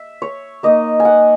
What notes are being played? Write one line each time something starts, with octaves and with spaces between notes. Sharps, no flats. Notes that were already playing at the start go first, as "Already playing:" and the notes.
Already playing: E5
C#5
A#3 D#4 D#5
G#5
F#5